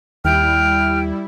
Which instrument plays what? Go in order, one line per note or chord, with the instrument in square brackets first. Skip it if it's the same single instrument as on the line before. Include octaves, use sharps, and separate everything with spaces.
[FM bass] D#2 [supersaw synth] G3 E4 [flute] G5 [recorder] F6